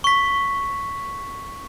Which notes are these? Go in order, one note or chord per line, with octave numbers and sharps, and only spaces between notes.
C#6 B6